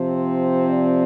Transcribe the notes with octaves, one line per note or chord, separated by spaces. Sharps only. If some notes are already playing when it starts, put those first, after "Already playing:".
Already playing: C3 F3 C4
C5
D5